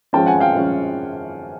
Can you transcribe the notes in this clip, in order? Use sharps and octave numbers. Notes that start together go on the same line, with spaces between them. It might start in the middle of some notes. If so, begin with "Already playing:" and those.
F3 G#3 C#4 G5 A5
F#5 G#5
F5 G5
F3 G#3 C#4